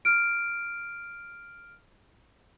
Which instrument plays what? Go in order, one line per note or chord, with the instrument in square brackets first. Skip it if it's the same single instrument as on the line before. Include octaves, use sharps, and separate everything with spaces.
[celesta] F6 D7